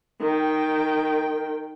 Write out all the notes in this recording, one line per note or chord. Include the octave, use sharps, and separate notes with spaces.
D#3 G5